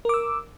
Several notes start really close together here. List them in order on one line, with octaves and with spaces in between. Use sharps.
A#4 D6 E6